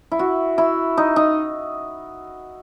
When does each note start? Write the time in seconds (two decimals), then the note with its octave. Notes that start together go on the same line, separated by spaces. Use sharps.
0.12 E4
0.19 F#4
0.58 E4
0.97 D#4
1.16 D#4